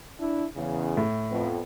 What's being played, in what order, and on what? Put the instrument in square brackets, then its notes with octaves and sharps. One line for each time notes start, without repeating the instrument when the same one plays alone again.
[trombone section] D4 E4
E2 C#3
[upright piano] A2
[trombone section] F2 B3